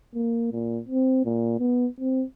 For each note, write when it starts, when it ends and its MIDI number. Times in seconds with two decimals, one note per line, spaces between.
0.15 0.48 58
0.52 0.80 46
0.88 1.21 60
1.25 1.55 46
1.59 1.87 59
2.00 2.24 60